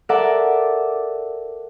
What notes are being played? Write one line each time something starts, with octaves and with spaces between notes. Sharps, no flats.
A4 A#4 D5 E5 F#5